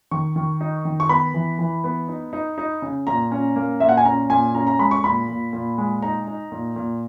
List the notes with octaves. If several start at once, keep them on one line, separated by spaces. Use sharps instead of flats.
D#3 C#6
D#3
D#4
D#3
C#6
B3 B5
E3
E3
B3
D#4
D#4
D#4
C#3
A#2 A#5
C#4
A#3
A#2 E5
F#5
G#5
C#4 A#5
A#2 G#5
C#4 A#5
A#5
G#3 B5
C#6
A#2 B5
A#2
A#2
G#3
D#4 A#5
D#4
A#2
A#2